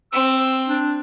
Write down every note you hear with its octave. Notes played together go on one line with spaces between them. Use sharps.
C4 E6
D4